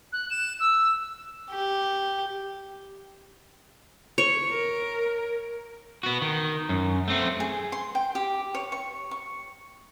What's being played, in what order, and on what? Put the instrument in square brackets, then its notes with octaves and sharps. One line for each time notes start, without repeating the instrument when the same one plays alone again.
[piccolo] F#6
E7
E6
[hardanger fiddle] G4
[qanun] C#5
[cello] A#4
[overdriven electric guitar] B3 F#4
D#3
F#2
A3 C4
[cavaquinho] G#4
C6
G5
G4
C#5
C#6
C#6